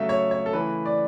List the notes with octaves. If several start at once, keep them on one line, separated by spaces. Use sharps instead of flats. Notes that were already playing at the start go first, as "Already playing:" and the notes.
Already playing: C#3 F#3 A3 E5
C#5
C#5
A4
C#3 E3 A3 B4
D5